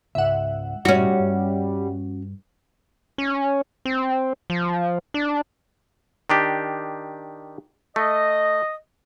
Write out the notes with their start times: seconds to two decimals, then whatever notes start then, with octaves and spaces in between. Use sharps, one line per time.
0.15 C#2 G#2 E5 F#5
0.85 G2 A#2 G3 C#4 D#4 F#4
1.19 G2
3.18 C#4
3.85 C4
4.50 F3
5.14 D4
6.30 D#3 D4 G4
7.96 A3 D#5